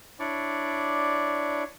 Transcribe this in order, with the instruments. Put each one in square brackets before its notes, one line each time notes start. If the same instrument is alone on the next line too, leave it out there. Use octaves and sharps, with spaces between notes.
[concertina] D4 E4 C#5 D5